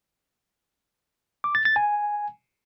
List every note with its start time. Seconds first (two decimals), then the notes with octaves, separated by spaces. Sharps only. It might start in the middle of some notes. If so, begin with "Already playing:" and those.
1.44 D6
1.55 A6
1.65 A6
1.76 G#5